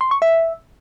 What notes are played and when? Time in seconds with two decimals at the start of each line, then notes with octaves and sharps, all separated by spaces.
0.01 C6
0.11 C#6
0.22 E5